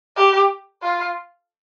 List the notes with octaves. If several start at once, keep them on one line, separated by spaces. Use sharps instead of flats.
G4
F4